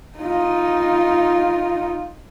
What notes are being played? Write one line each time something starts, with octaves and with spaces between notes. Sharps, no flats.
D#4 F4